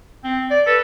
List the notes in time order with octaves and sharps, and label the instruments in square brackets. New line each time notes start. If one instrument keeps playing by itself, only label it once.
[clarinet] C4
D5
[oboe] A4 [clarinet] B4